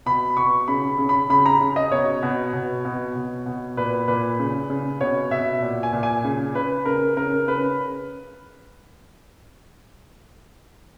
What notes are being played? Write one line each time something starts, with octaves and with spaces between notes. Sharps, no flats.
B2 B5
B2 C#6
C#3 B5
C#3
B5
C#3 B5
A#5
C#3
D#5
B2 C#5
B2
B2
B2
B2
B2
A#2 B4
A#2 B4
C#3
C#3
B2 C#5
B2 E5
A#2
G#5
A#2
G#5
C#3
C#3 B4
C#3 A#4
C#3 A#4
C#3 B4